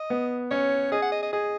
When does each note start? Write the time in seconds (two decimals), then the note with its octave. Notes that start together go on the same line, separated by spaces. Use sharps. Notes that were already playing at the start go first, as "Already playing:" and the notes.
Already playing: D#5
0.10 B3
0.51 C#4 C#5
0.92 G#4 D#5
1.02 F#5
1.12 D#5
1.22 D#5
1.33 G#4 D#5